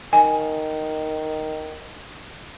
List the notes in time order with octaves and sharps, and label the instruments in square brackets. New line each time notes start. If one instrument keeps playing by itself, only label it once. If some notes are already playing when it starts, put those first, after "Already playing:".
[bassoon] D#3 [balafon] G#5